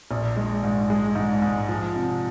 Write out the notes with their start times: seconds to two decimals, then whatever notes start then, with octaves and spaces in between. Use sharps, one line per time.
0.11 A#1
0.36 G#3
0.63 G#2
0.90 G#3
1.15 G#2
1.42 G#2
1.68 F3
1.96 C3